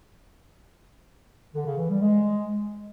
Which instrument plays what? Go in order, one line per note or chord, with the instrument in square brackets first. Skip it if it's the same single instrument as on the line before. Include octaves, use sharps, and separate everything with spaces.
[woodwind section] D3
C#3
E3
G3
G#3